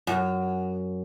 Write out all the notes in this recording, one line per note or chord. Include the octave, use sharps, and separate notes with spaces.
F#2